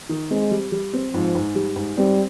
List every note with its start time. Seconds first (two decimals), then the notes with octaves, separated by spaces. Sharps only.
0.09 D#3
0.30 G#3 C4
0.51 G3
0.72 G3
0.93 C4
1.13 G#2 F3
1.35 G#2
1.55 G3
1.76 G#2
1.97 G3 C4